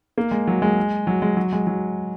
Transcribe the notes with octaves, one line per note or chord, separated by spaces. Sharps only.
A#3
G#3
F#3
G#3
F#3
G#3
F#3
G#3
F#3